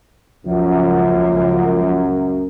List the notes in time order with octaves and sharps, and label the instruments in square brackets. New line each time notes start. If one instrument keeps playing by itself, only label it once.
[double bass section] C#2 A#3 [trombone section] F#2 [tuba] F3